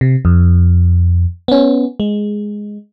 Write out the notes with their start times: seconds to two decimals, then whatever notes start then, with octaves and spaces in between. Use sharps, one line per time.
0.01 C3
0.25 F2
1.48 B3 C#4
2.00 G#3